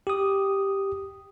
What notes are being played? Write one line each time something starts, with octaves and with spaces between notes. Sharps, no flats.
G4 D#6